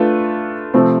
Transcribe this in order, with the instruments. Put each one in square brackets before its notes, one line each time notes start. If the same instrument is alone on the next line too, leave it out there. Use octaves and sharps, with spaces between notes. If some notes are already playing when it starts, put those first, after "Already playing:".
Already playing: [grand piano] A3 D4 F4 B4
C3 F3 A3 C4